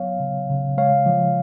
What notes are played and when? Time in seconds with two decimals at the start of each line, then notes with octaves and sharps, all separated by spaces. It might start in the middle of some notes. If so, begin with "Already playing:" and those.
Already playing: F#3 B3 C#5 F5
0.20 C#3
0.49 C#3
0.77 G#3 C#5 F5
1.06 F3